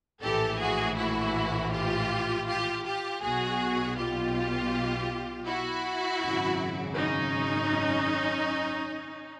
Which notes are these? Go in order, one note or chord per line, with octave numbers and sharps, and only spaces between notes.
A#1 A2 E3 G4 A4
F#4 G#4
E4 F#4
F4 G4
F4 G4
F4 G4
B1 B2 F#4 G#4
F4 G4
E4 F#4
G#1 F#2 C#3
C#4 D#4